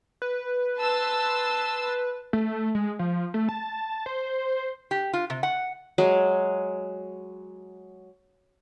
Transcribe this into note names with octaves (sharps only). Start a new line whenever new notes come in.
B4
A5 C6 E6
A3
G#3
F3
A3
A5
C5
G4
F4
C3
F#5
F#3 G#3